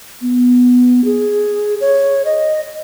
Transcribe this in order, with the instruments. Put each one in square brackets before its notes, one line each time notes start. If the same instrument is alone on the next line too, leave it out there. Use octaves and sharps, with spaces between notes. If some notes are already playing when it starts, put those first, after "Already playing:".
[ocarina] B3
G#4
C#5
D#5